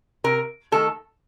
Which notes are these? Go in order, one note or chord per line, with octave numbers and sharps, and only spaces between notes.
C3 A#4
D#3 A3 A4